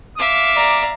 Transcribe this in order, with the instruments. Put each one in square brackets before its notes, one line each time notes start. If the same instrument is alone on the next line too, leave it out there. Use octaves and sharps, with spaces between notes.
[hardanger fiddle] E5 F5 [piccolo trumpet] D6
[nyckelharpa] D5 A#5